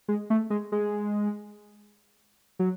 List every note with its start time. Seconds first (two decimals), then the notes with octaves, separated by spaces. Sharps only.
0.08 G#3
0.30 A3
0.50 G#3
0.72 G#3
2.59 F#3